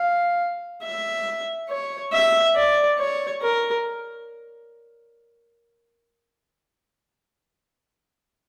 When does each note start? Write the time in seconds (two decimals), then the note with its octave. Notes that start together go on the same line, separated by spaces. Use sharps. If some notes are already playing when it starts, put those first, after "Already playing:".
Already playing: F5
0.82 E5
1.69 C#5
2.12 E5
2.55 D5
2.99 C#5
3.42 A#4